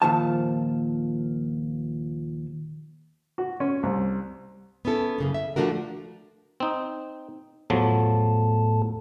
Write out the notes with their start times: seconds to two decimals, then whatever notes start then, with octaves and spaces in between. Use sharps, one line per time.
0.02 D#2 A#2 F3 A5
3.38 F#4
3.60 C#4
3.83 C2
4.85 B3 C#4 E4 A4
5.18 F#2 C#3 A#3
5.34 E5
5.56 F3 G3 A3 D4 F#4 A#4
6.60 C4 D#4
7.70 E2 A2 F3 F#3 A4